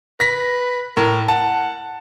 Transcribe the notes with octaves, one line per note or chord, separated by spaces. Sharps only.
B4 A#6 B6
A2 A#4
F#5 A5